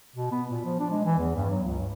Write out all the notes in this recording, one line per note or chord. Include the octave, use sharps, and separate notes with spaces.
B2
B3
A#2
F3
D4
G#3
E3
E2
G2
F#3
C#2
G2